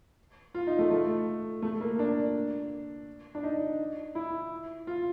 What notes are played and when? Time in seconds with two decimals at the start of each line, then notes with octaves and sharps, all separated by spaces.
0.54 F4
0.67 D#4
0.79 A3
0.91 A3
1.62 A3
1.81 A#3
1.99 D4
3.35 D4
3.43 D#4
4.15 E4
4.87 F4